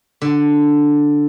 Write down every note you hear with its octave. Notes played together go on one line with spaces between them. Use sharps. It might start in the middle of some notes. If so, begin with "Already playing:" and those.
D3